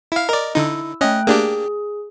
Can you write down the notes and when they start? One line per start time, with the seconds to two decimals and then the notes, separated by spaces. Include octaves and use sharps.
0.12 E4 F5
0.29 A#4 D5 D#5
0.55 D3 D#4 E4 E6
1.01 A3 C#4 D#5 G5 F#6
1.27 A#3 D4 G4 G#4